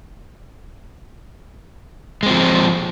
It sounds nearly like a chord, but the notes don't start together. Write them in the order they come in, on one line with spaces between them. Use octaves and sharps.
G#3 C4 F3